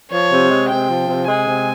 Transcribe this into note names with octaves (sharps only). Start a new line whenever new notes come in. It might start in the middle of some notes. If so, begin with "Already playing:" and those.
F3 C#5
C3
G#3
C3 G5
F3
C3
G#3 G#5
C3